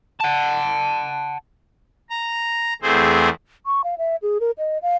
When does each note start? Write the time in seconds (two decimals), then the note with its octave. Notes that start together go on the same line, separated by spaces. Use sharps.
0.20 F#5 A5
2.10 A#5
2.82 E2 A3 C4 G#4 C5
3.66 C#6
3.84 F5
3.98 E5
4.22 G#4
4.40 A#4
4.58 D#5
4.82 F5